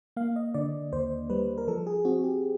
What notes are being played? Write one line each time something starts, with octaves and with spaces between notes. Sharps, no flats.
A#3 F5
D#5
D3 D5
D#2 C5
G3 B4
A#4
F3 A4
G#4
C4 F#4
G4